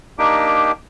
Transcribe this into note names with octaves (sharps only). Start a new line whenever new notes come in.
A#3 D4 D#4 G4 G5